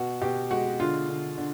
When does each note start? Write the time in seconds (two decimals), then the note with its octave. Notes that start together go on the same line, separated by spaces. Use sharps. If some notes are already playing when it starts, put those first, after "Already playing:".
Already playing: B2 F#4
0.21 B2 G4
0.51 G#3 F#4
0.80 D3 F4
1.09 D3
1.38 D3